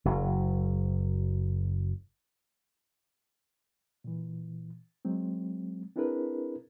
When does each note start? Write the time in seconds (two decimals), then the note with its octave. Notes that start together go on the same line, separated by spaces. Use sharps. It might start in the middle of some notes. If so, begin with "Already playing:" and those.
0.05 F#1 F#3
4.04 A#2 E3
5.05 F#3 G#3 C4
5.96 C4 D4 E4 G#4 A#4 B4